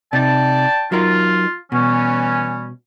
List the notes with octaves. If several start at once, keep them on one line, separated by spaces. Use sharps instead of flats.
C3 D#4 D5 G5 A5
F#3 D#4 F4 A#4
B2 E3 G3 C#4